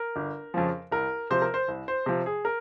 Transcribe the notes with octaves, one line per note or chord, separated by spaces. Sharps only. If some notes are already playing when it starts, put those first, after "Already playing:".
Already playing: A#4
G1
F2 C#3 F3
C2 A#4
C3 F3 C5
A#4
C5
C2
C5
C3 F3
G#4
A#4